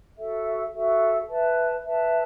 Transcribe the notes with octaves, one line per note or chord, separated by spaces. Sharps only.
F#4 A4 E5
F#4 A4 E5
B4 E5 A5
B4 E5 A5